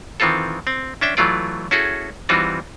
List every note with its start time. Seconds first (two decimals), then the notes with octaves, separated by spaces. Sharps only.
0.20 D#3 E3 C4 F4 A4
0.67 C4
1.01 C#4 D4 E5 G5
1.17 E3 F#3 A3 F4 D5
1.71 C#4 E4 F#4 G#4 A4
2.29 E3 G3 C4 D#4 F4 F#4